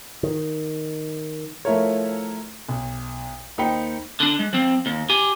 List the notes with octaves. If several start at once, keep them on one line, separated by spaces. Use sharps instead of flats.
D#3
F3 A3 E4 A4 A#4 C#5
B1
D#2 D#4 C5 G5 B5 C#7
D3 D4
G#3
F3 C4
D#2
G4 G#5